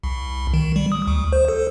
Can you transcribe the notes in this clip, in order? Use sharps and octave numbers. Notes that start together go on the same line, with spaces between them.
C2
D#3
G3
D#6
D2
C5
A4